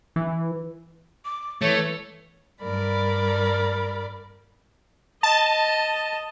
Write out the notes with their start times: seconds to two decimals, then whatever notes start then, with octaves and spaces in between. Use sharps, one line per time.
0.16 E3
1.25 D6
1.62 E3 A3 C#5
2.62 G2 G3 A#4 D5 B5
5.23 D#5 A5